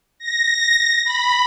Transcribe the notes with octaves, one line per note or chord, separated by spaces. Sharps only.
A#6
B5